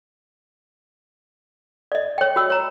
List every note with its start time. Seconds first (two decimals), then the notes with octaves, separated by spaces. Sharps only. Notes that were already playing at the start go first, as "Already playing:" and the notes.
1.92 D5 D#5
2.18 C#5 G5
2.36 F#4 E6
2.50 C#5 A#5